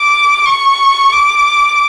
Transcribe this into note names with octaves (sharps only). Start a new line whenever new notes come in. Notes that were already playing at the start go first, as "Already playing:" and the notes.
Already playing: D6
C#6
D6